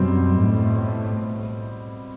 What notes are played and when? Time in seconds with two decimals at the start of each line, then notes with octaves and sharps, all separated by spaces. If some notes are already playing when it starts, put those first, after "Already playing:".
Already playing: F#2 B2 G3 C4
0.38 A2